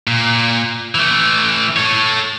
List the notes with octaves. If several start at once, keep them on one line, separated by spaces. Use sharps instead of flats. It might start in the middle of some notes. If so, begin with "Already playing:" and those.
A#2
E3 A3
A4 C#5